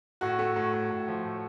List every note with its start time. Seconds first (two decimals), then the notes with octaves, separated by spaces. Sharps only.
0.21 A2 F#4
0.39 A3
0.56 A2
0.74 A2
0.90 A2
1.08 F3
1.24 A2